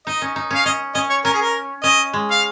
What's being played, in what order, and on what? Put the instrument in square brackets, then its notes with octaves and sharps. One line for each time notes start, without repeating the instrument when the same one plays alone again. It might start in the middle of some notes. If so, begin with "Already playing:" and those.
[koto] D#4 [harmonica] D#5
[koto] C#4
D#4
[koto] C#4 [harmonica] F5
[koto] C#4 [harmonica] D#5
[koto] C#4 [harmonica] D#5
[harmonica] C#5
[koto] C#4 [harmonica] A#4
[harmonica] G#4
A#4
[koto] C#4 [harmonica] D#5
[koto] G#3
[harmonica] F5